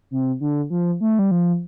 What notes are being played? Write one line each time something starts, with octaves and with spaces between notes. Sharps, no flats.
C3
D3
F3
A3
G3
F3